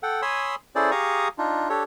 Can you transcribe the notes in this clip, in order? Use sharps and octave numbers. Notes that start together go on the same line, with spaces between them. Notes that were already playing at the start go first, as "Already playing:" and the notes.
A4 F#5 G5
C#5 G#5 B5 C6 D#6 E6
C#4 E4 G#4 A4 C5 D5
G4 G#4 F5 A#5 C#6 D#6
D4 D#4 F4
D4 G4 A4 C#5